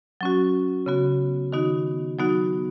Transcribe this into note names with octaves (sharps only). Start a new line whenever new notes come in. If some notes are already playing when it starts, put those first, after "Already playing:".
F#3 C#4 F#4
C#3 B3 F#4
D#3 B3 D#4 F#4
F#3 B3 D#4 F#4